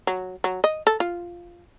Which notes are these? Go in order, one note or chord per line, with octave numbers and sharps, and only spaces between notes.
F#3
F#3
D#5
A4
F4